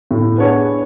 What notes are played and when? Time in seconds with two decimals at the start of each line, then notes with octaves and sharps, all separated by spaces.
0.11 A2
0.38 B3 D4 G#4 C#5 F#5